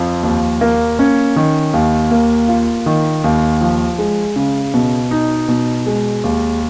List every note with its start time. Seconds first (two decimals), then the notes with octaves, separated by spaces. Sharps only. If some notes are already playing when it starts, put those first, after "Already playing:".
Already playing: F2 F3
0.23 D#2
0.61 A#3
0.99 C#4
1.36 D#3
1.74 D#2
2.11 A#3
2.48 F4
2.86 D#3
3.24 D#2
3.61 F3
3.99 G#3
4.36 C#3
4.74 B2
5.11 D#4
5.49 B2
5.86 G#3
6.24 D#2